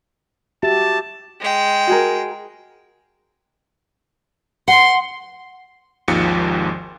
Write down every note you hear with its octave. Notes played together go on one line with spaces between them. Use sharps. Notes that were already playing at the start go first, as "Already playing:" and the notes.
F#4 G4 E5 A5
G#3 G5
F#4 G#4 A#4
F#5 C6
G#1 D#2 G#2 F3 C#7